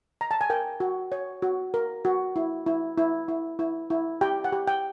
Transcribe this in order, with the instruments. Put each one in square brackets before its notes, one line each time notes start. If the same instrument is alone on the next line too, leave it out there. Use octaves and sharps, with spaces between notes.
[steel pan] A#5
A5
G#5
A#4 G5
F#4
C#5
F#4
A#4
F#4
E4
E4
E4
E4
E4
E4
G4 G5
F#5
G4
G5